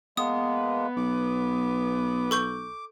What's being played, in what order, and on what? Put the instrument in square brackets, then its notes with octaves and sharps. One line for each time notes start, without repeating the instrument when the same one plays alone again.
[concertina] G#3 A#3 [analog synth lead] B3 [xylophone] D#6
[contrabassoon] B1 [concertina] D6
[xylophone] A4 C#6 G6